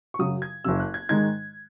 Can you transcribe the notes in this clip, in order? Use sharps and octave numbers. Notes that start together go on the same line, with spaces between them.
C#6
F#2 C#3 F#3 D#6
G#6
F#1 F#2 C#3 E6
F#6
G#6
G#2 D#3 G#3 D#4 G#6